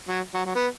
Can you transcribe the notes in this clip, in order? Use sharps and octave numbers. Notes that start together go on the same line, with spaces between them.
F#3
F#3
F#3
B3